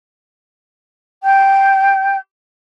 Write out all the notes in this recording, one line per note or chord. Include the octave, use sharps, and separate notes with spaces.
G5 G6